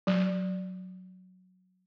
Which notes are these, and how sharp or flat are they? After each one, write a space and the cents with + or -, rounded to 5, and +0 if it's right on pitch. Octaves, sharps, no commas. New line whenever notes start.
F#3 -5